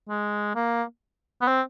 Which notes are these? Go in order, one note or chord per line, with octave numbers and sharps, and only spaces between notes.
G#3
A#3
B3
C4